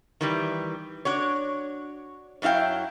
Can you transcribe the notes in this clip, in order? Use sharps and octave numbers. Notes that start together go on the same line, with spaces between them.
D#3 E3 G3
D4 F#4 C#5
F#2 F#3 E4 F5 G5